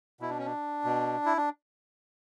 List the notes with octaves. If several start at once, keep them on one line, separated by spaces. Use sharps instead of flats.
B2 E4
D4
C#4
D4
B2
E4
D4